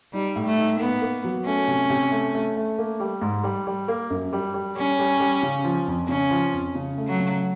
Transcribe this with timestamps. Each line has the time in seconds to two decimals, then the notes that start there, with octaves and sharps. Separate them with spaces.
0.13 G3 D#4
0.36 A2
0.46 A3
0.58 D#4
0.80 A#3 B3
1.02 A#3
1.24 F#3
1.46 A3 C#4
1.68 C3
1.90 C3
2.11 A3
2.34 A3
2.56 A3
2.78 A#3
3.00 G3
3.22 G#2
3.44 G3
3.67 G3
3.88 A#3
4.10 F#2
4.33 G3
4.54 G3
4.76 G3 C#4
4.99 G3
5.20 G3
5.43 C#3
5.64 F3
5.87 F2
6.08 C#3 C#4
6.30 F3
6.53 F2
6.75 C#3
6.97 A3
7.08 F#3
7.19 C#3